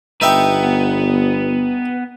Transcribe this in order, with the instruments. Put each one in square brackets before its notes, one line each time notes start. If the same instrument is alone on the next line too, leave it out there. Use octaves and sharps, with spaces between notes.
[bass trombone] G1 [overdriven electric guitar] B3 B4 [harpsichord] D#4 E5 G5